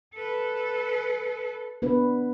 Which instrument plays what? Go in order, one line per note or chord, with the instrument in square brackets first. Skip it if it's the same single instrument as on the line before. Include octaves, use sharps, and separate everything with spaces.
[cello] A4 B4
[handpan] B3 D4 B4